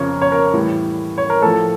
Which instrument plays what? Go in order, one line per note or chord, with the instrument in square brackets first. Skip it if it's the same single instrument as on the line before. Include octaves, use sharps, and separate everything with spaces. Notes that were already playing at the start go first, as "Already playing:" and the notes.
Already playing: [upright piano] F2 C#3 F3 A#4 C#5
C#5
A#4
A2 E3 G3
C#5
A#4
A2 F3 A4